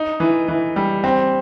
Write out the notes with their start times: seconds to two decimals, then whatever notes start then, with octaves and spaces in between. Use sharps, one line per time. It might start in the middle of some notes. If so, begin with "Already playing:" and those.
Already playing: D#4
0.20 E3
0.48 E3
0.76 G3
1.04 C4